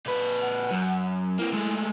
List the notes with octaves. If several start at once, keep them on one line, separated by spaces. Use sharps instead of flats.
A#2 B4
F#5
F#2
A#3 C4 E4
G#3 A3